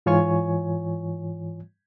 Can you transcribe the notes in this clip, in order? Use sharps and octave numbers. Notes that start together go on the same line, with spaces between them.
G#2 E3 F4 C#5 G#5 C#6